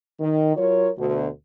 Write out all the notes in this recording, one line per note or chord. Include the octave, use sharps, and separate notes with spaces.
D#3
F#3 F4 A#4 C#5
D2 B2